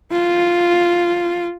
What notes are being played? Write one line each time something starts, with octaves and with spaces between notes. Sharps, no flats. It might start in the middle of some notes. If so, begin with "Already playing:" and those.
F4